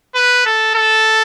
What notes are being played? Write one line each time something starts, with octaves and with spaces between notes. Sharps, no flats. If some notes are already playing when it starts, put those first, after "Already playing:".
B4
A4
A4